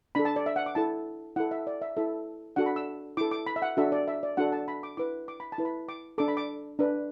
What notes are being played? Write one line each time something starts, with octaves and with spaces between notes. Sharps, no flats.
D4 A4 B5
A5
D5
E5
F#5
D6
E4 A4 A5
E4 A4 F#5
E5
D5
E5
E4 A4 E5
D4 F#4 A4 F#5
B5
E6
E4 A4 D6
D6
B5
E5
F#5
D4 F#4 A4 E5
D5
E5
D5
D4 F#4 A4 F#5
A5
B5
D6
E4 B4 D6
D6
B5
A5
E4 B4
B5
D6
D4 A4 D6
B5
D6
D4 B4